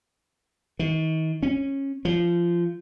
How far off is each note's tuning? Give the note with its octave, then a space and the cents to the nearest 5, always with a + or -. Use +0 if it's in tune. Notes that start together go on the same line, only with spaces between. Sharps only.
D#3 +40
C#4 -15
F3 -20